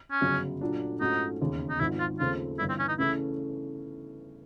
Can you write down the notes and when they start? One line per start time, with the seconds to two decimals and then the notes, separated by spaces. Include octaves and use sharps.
0.11 C#4
0.21 G1 F#2 C#3 F#3
0.61 A#2 F#3 A3 D4
1.01 G#2 F3 A3 C#4 D#4 F#4
1.41 E1 D#2 C#3
1.70 D#4
1.80 G#1 G#2 F3 E4
1.99 F4
2.19 D#2 C#3 F3 A3 C4 F4
2.59 G1 G2 E3 E4
2.69 C4
2.79 C#4
2.89 D#4
2.99 C#3 E3 A3 C#4 E4